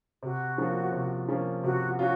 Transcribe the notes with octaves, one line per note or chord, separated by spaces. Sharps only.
C3 F#4
F3 A#3 C#4 F4
C3
F3 A#3 C#4 F4
C3 F#4
C#4 F4 F#4